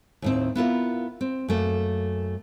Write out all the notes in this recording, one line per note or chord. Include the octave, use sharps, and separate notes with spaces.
D#2 A2 C4
B3 E4 F4 A#4
C4
F#2 A3 A#3